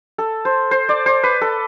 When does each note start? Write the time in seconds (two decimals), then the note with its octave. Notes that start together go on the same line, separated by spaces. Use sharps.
0.18 A4
0.45 C5
0.71 C5
0.89 D5
1.06 C5
1.23 B4
1.41 A4